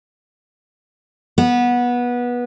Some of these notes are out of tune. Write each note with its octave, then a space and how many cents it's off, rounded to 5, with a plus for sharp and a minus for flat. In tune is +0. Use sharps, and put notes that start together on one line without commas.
B3 -20